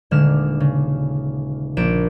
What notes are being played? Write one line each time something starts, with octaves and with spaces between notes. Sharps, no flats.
D#1 D3 G#3 F6 E7
C#3
A#1 D7 E7